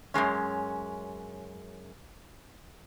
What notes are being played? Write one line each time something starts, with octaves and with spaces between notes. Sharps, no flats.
F#2 B2 G#3 C#4